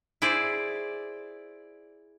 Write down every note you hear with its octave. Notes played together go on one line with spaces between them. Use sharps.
E4 G#4 C5 D5